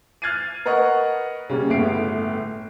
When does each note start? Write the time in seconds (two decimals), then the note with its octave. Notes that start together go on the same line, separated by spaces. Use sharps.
0.22 F6 F#6 G#6 A6 C7 D#7
0.66 A#4 B4 D#5 F#5 C#6
1.49 C#3 G3 A#3
1.70 G1 A2 A3 B3 C7 D7